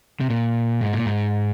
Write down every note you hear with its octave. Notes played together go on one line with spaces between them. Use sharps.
C3
A#2
G#2
A#2
G#2